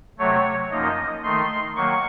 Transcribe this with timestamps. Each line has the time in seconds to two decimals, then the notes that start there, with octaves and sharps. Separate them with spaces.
0.18 C3 F#3 A3 C#5
0.71 F#2 F3 A#3 D#4 D#5
1.24 D#3 A3 D#4 C6
1.76 D#3 F#3 A#3 C#6